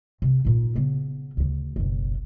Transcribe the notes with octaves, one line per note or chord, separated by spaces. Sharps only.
C3
A#2 D#4
C#3 B3
D2 C#3
F#1 B1